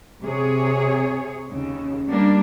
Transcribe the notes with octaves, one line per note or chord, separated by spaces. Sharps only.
C3 G#4 C#5
D#2 C#3
G3 A#3 D4